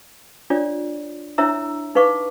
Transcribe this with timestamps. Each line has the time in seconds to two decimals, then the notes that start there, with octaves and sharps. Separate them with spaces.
0.50 D4 F4 C#5 D5
1.38 D4 E4 C#5 E5 A#5 E6
1.95 D#4 B4 F5 C#6 D6